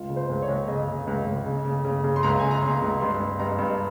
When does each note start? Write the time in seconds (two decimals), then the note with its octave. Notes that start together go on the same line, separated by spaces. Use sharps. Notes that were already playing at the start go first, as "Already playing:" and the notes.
Already playing: C#2 F4
0.10 C#3
0.16 C5
0.30 C#2
0.42 C#5
0.48 C#2
0.68 C#3 D#5
0.88 C#3
1.07 C#2
1.26 C#2
1.46 C#3
1.65 C#3
1.84 C#3
2.04 C#3
2.16 C6
2.23 C#2 A#5
2.40 C#3 G#5
2.51 A#5
2.62 C#3 C6
2.82 C#2
3.01 G2 C6
3.20 G2
3.39 G2 A#5
3.59 G2